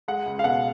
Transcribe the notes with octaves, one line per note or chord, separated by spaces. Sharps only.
G#3 F#5
C#2
F5
B2 F#5